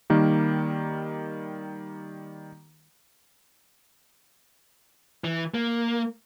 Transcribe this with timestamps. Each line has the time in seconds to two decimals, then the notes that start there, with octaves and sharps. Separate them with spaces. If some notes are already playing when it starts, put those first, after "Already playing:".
0.10 D#3 G3 A#3
5.24 E3
5.54 A#3